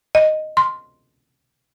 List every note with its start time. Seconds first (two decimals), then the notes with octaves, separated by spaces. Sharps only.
0.15 D#5
0.57 C6